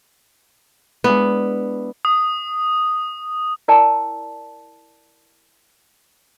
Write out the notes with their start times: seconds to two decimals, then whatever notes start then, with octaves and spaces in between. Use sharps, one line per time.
1.04 G#3 B3 D4 E4
2.05 D#6
3.68 E4 A#4 D5 G5 A5